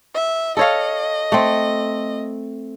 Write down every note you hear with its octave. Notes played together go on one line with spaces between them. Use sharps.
E5
A4 C#5 D#5 F5
A3 C4